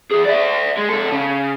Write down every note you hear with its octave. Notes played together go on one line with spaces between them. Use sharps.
E3 G#4
D5 E5
G#3
C3 A4
C#3